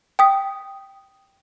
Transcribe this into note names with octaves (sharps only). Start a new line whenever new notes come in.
G5 D#6 B6